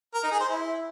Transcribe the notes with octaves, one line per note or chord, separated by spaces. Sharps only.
A#4
D#4
G#4
C5
E4